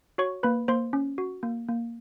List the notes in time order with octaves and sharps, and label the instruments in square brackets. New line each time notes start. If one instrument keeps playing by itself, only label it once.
[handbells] F#4 C#5 C#6
A#3 B4 B5
A#3 C5 C6
C#4
F#4
A#3
A#3